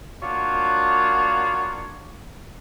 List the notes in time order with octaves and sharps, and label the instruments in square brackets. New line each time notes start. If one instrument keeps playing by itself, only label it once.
[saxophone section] A#3 D4 F4 F#4 C#5